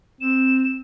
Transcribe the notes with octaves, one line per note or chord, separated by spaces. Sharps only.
C4 E7